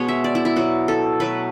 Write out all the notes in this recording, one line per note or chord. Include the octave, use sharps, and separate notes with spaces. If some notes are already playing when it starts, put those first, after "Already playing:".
Already playing: B2 G#3 B3 C#5
E5
D5
E4
E4
B2 F#3 B3 F#4
A4
B2 F#3 A3 B4